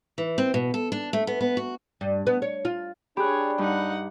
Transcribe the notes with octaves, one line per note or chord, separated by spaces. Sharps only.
E3
C4
B2
A4
D4
A3
B3
B3
F#4
G2
B3
C#5
F4
D4 G4 G#4 C#5 B5 F#6
G2 D#4 F#5